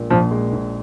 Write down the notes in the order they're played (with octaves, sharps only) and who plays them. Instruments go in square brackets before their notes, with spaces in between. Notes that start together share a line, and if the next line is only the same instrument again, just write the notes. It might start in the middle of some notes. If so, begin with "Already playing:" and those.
Already playing: [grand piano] A#1 A#2 G#3
[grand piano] A#1 [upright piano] F3
[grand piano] G#3
A#1